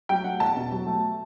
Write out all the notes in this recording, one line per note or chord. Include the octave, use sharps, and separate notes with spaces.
F#3 G5
A3 F#5
E2 A5
B2
F#3
A3